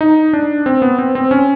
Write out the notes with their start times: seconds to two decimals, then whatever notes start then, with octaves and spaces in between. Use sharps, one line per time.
0.01 D#4
0.33 D4
0.66 C4
0.82 B3
0.99 C4
1.15 C4
1.31 C#4